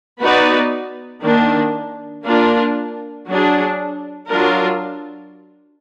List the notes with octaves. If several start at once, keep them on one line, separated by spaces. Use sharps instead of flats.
B3 D#4 F#4 B4 D5
D#3 A#3 D4
A#3 D4 F4 A#4
F#3 D4 G#4
F#3 D4 F4 A#4